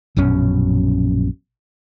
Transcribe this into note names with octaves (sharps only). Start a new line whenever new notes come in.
A#1 F#2 B2 C#4